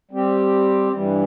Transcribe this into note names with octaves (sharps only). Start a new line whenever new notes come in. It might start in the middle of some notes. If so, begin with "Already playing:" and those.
G3 C4 G4
G2 E3 G3